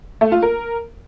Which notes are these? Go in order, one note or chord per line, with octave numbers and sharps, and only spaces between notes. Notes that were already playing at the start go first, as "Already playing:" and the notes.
A3
F4
A#4